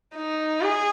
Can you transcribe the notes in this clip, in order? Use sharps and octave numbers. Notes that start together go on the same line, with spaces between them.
D#4
G#4